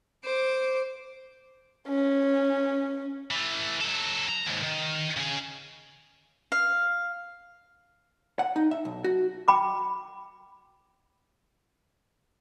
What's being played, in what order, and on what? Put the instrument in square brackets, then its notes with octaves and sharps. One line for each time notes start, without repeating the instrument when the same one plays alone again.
[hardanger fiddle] C5 D6
[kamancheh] C#4
[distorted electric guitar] E3 A3
F#3 A4
A#5
D#2 G#2
D#3
C#3 G#4
[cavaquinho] F5
[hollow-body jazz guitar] F#5
D#4
E5
B1
F#4
[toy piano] G5 B5 D6